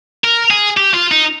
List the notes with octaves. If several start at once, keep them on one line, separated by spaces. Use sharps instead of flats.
A#4
G#4
G4
F4
D#4